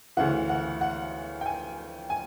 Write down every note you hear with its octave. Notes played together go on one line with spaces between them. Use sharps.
D2 C#3 E3 F#5
F#5
F#5
G5
G#5
G#5